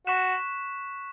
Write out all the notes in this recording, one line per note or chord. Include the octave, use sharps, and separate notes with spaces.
F#4 C#6 F#6 B6 E7